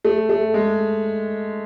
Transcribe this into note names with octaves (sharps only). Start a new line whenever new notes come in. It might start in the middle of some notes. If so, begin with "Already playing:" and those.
A3
A3
G#3